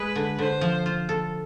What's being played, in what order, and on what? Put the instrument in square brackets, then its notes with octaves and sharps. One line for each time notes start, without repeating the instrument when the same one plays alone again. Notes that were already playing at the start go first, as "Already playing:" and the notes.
Already playing: [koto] G#3 [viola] B4
[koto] D3
[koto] D3 [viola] C5
[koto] F3
F4
A4